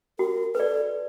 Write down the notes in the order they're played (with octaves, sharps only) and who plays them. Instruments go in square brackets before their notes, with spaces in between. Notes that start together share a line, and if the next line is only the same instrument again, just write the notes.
[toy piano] F#4 [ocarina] A#4
[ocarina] A4 [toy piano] B4 D5